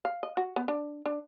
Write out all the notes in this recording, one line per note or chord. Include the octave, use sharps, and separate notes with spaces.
F5
D#5
F#4
B3
D4
D4